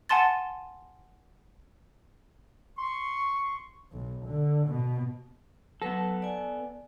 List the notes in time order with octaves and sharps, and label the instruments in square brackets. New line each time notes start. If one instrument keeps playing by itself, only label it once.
[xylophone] F#5 G#5 A5 C6 A6
[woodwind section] C6 C#6
[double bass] B1
D3
B2
[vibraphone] F#3 B4 [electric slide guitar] B3 A4
[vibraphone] D5 G#5